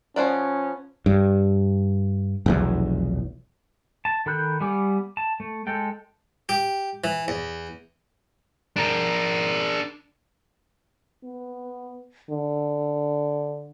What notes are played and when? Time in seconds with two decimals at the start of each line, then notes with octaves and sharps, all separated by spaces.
0.16 F3 B3 C#4 D5
1.06 G2
2.46 F1 B1 E2
4.05 A5
4.26 D#3 A4 B5 F#6 G6
4.61 G3 B3 G#5 D6
5.17 A5
5.40 A3
5.67 G#3 A4 G5
6.49 G4
7.04 E3
7.28 E2
8.76 D4 A#4
11.24 B3
12.30 D3